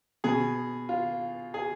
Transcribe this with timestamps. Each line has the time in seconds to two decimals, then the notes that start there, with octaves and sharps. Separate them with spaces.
0.24 B2 G#4
0.89 F4
1.54 G#4